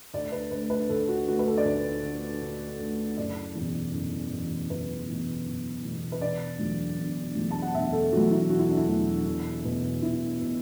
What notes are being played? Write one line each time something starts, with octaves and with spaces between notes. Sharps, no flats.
D2 D5
B4
D3 A3 B4
B4
D2 A4
F#4
D3 A3 F#4
B4
A4
D5
D2 B4
D3 A3
D2
D3 A3
F#1 D5
E2
B2
F#1
E2 B2
F#1 B4
E2 B2
F#1
E2 B2
B4
E1 D5
E2 D3 F#3
E1
E2 D3 F#3
A5
F#5
E1 E5
A4
E2 D3 F#3 F#4
E4
E1 F#4
E4
D4
E4
E2 D3 F#3
E1
E2 B2 B3
E1 E4
B2 B3